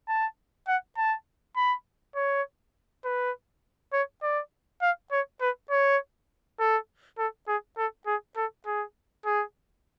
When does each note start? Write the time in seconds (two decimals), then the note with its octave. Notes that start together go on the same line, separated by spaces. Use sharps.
0.08 A5
0.68 F#5
0.97 A5
1.57 B5
2.16 C#5
3.05 B4
3.93 C#5
4.23 D5
4.82 F5
5.12 C#5
5.41 B4
5.71 C#5
6.59 A4
7.18 A4
7.48 G#4
7.78 A4
8.07 G#4
8.37 A4
8.66 G#4
9.26 G#4